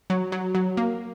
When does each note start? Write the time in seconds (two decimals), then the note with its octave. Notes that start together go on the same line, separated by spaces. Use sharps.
0.10 F#3
0.32 F#3
0.55 F#3
0.77 A#3